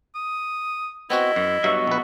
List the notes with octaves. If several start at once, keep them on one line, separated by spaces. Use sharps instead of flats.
D#6
B3 C4 E4 F#4 D#5
F#2
G2 F#3 B3 F#4 E5
A#1 B4